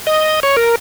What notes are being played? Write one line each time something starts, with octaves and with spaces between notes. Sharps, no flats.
D#5
C#5
A#4